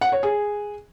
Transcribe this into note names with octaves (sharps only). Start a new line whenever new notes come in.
F#5
C#5
G#4